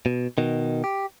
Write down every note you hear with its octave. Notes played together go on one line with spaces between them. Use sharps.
B2
B2 D#3
G4